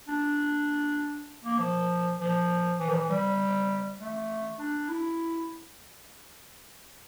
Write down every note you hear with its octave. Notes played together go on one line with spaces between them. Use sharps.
D4
A#3
F3
F3
E3
F3
E3
G3
A3
D4
E4